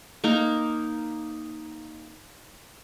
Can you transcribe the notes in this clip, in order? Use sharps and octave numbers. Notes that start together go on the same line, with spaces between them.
A#3 D#4 A#4